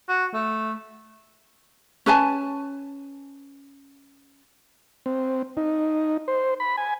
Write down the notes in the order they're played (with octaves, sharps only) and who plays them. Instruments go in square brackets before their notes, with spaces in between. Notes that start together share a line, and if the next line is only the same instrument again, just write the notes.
[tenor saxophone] F#4
A3
[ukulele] C#4 B4 G#5 A5
[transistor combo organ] C4
D#4
C5
B5
G#5